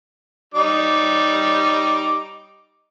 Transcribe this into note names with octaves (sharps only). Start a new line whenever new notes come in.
G3 D#4 D6